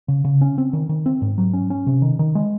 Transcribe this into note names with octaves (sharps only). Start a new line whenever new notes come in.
C#3
C#3
C#4
C4
D#3
D#3
C4
G#2
F#3
C#4
C#4
C3
D#3
D#3
G#3